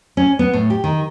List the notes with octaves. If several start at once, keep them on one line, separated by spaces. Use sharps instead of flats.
C#4
B3
A2
G4
D#3